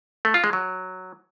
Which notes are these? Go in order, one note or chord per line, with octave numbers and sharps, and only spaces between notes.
A3
F4
G#3
F#3